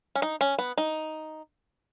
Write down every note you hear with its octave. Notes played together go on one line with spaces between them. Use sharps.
C#4
D#4
C#4
B3
D#4